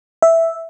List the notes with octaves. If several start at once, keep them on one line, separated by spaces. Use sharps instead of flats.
E5